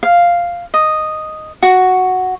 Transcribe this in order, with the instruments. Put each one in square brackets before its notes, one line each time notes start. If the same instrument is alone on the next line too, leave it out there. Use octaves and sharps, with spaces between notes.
[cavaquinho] F5
D#5
F#4